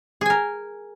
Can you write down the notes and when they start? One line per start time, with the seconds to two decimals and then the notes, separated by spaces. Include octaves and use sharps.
0.21 G#4
0.26 G#5
0.30 A#4